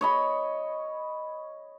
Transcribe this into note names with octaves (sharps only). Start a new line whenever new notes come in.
C#5 D#5 B5